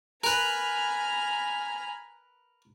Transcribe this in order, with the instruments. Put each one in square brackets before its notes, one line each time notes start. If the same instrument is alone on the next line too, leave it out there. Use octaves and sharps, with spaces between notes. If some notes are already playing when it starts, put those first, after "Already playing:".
[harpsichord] A#4 B4 [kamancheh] G#5 B5 [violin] A#5 F6